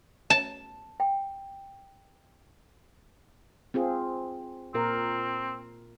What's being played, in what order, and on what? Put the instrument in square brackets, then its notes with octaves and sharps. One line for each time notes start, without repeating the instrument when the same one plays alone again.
[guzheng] A5
[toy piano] G5
[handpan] C4 F4 G#4
[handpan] A#2 A#4 [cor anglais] C4